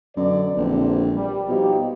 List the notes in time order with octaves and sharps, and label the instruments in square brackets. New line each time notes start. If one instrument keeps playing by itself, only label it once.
[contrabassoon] F#2 [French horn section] B2 D3 D5
[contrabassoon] A#1 [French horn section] E2 D3 C4
[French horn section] G3
[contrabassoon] B2 [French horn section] F3 D#4 G4